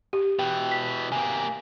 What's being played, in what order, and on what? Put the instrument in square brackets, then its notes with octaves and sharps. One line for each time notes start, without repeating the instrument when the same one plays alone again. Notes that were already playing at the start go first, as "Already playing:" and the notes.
[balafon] G4
[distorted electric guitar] B2 E3 [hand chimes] G5
[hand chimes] B6
[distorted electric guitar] C3 A#3 [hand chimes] G#5